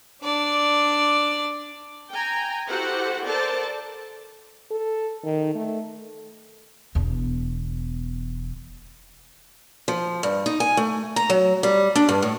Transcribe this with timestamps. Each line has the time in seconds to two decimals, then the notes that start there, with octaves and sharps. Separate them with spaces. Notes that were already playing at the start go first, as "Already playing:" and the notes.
0.23 D4 D5
2.11 G5 G#5 A#5
2.68 E4 F#4 G4 A4 C5 F#5
3.25 A4 A#4 C5 D5 A5
4.71 A4
5.24 D#3
5.55 A3
6.95 E1 E2
9.88 F3
10.23 G2
10.46 D#4
10.60 G#5
10.77 A3
11.16 A#5
11.30 F#3
11.63 G3
11.95 D4
12.09 G2
12.22 A2